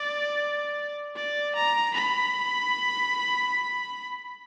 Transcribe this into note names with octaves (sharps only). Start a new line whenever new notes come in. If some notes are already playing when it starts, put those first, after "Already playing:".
Already playing: D5
D5
A#5
B5